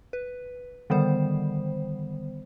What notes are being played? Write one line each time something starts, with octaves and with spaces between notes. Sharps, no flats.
B4
D3 D#3 G3 B3 C5